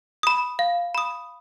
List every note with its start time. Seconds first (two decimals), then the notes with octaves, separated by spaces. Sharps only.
0.23 B5 D#6
0.59 F5
0.95 B5 D#6